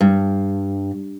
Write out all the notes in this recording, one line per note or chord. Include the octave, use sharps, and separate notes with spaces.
G2